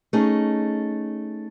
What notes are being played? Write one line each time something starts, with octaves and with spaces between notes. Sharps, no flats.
A3 C#4 D#4 G#4